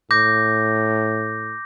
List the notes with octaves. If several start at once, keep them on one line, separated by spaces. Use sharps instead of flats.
A2 D6 G6 A#6